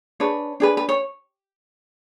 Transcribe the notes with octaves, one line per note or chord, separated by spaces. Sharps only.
D4 G#4 B4 C#5
D4 G#4 B4
B4
C#5